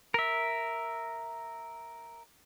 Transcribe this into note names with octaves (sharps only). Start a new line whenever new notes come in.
A#4 E5